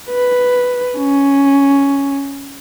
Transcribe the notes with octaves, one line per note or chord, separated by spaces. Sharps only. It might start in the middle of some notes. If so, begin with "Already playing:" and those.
B4
C#4